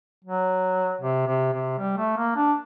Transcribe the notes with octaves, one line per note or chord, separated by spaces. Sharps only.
F#3
C3
C3
C3
G3
A3
A#3
D4